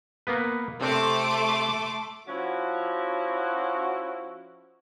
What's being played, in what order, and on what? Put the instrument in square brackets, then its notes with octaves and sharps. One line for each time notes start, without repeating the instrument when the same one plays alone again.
[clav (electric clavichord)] A#3 B3 B4
[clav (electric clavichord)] C3 C4 [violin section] A3 C6 D6
[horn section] F3 C#4 E4 F#4